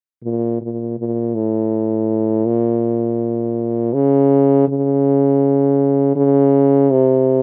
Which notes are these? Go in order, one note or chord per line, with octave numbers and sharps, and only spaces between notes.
A#2
A#2
A#2
A2
A#2
C#3
C#3
C#3
C3